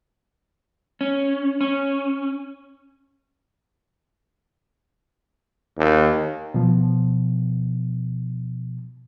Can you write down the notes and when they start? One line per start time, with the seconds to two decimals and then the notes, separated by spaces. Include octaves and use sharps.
1.01 C#4
1.61 C#4
5.78 D#2
6.54 B2 F3